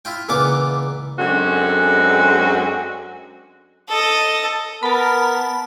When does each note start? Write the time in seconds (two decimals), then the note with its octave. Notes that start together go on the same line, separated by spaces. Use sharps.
0.05 E4 F4 G5
0.29 C#2 A#2 E3 B3 F4 D6
1.18 F#2 G#3 C4 D4 F#4 A4
3.89 A4 D#5
4.83 B3 A#4 A5 B5